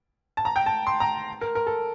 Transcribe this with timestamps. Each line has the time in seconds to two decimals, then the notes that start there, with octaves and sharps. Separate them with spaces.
0.37 A5
0.45 A#5
0.56 G5
0.66 A5
0.87 C6
1.00 A#5
1.41 A#4
1.55 A#4
1.67 A4